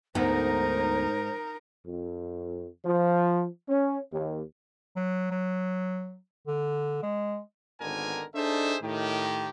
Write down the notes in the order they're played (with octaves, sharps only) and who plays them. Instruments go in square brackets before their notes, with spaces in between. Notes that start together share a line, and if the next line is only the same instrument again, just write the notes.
[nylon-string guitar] D2 B3 F#5 [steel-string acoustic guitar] G#2 [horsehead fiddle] D#4 A#4 [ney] C5
[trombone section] F2
F3
C#4
D#2
[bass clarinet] F#3
F#3
D3
G#3
[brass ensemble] G#1 D3 D#3 B3 A#4 G#5
D4 D#4 G#4 A4 C5 E5
A2 D#3 G4